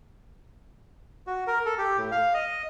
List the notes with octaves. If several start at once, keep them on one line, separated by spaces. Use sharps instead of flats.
F#4
A#4
A4
G4
A2
F5
D#5